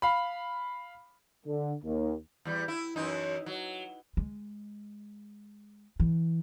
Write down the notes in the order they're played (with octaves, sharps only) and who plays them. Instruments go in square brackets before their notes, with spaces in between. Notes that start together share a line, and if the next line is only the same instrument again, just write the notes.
[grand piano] F5 B5
[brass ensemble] D3
D#2
[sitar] E2 G3
E4
F#2 E3 D#4
F#3
[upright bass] G#3
E3